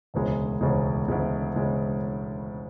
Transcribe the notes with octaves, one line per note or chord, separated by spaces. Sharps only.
E1 D2 C#3 G#3
E1 D2 C#3 G#3
E1 D2 C#3 G#3
C#3 G#3